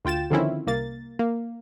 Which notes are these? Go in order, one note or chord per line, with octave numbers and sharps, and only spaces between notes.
D2 F4 G5 A6 E7
D3 D#3 F3 C4 C#4 E4
C2 A#3 A6
A#3